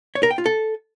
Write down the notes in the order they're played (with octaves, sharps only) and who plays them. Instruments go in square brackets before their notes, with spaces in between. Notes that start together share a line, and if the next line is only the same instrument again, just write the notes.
[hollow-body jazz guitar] C#5
A#4
G5
F4
A4